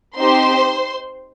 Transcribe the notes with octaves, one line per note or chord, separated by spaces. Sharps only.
C4 D#4 G4 C5 C6